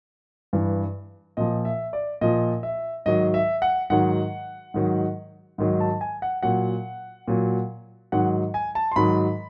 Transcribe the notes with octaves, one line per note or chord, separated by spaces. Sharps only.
G2 E3
A#2 F3 D#5
E5
D5
A#2 F3 D#5
E5
G#2 D#3 F#3 D#5
E5
F#5
G#2 D#3 F#3 F#5
G#2 D#3 F#3
G#2 D#3 F#3
A5
G#5
F#5
A#2 F#3 F#5
A#2 F#3
G#2 D#3 F#3 F#5
G#5
A5
C6
G#2 D#3 F#3 B5